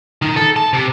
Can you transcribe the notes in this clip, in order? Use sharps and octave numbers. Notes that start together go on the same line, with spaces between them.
D#3 D#4
A4
A5
C3